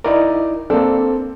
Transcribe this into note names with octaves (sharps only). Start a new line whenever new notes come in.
D#4 E4 A#4 D5
A#3 C4 D4 A4